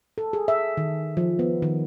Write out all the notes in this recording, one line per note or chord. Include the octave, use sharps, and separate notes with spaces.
A4
G#4
E5
D#3
F3
B3
D#3